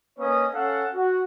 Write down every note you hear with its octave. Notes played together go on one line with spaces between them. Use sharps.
A#3 C#4 B4 C#5 D#5 D#6
C#4 A4 F5 F#5
F#4